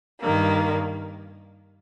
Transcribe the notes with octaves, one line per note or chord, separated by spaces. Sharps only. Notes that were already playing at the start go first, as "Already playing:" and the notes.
G2 D#3 A#3